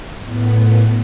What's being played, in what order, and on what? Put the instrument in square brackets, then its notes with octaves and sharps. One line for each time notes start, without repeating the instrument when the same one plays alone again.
[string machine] A2 B3